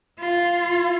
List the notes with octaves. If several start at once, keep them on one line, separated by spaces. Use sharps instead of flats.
F4